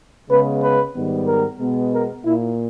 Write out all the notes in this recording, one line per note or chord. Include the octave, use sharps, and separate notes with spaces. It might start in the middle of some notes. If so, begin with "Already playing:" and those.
C#3 G#3 B3 B4
B4
G#2 D#3 G3 B3
A#4
B2 G#3 B3
A#4
A#2 A#3 E4